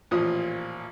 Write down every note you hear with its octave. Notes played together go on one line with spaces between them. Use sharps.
A1 A#2 F3 D#6